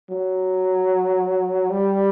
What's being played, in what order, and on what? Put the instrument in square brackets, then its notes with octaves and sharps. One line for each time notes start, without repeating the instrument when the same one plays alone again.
[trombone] F#3
G3